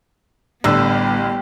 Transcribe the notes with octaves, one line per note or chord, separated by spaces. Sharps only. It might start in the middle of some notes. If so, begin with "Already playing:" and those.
A1 D3 G3 B3 G4 E6